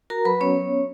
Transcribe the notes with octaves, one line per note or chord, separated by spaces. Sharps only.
F#4 A#4 A#5
F#3 B4 B5
B3 C#4 C#5